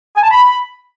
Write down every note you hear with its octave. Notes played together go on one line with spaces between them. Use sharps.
G#5
A5
B5